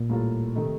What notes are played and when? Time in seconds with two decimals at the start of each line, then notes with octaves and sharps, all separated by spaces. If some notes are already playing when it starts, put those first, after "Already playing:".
Already playing: A#2
0.09 A2 G3 A#3 F4 A4
0.55 C3 D#3 A3 D#4 A4